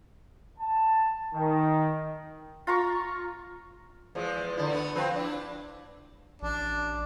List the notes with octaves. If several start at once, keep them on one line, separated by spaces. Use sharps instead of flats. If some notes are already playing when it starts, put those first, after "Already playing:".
A5
D#3
F4 A#5 C#6
E2 F3 G#3
D3 E4
A3 B3
F3 C4 B4
D4 E4
A1 D4